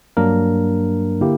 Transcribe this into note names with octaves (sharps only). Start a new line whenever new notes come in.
G2 F#3 A#3 D4 A#4
D3 A#3 E4 G4